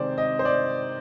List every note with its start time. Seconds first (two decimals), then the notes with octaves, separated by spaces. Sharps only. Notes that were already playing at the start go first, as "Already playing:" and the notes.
Already playing: C3 D#3 G#3 C4 C5 D5
0.18 D#5
0.39 C5
0.45 D5